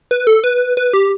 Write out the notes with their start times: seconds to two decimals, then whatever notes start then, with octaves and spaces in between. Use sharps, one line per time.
0.11 B4
0.27 A4
0.44 B4
0.77 B4
0.93 G4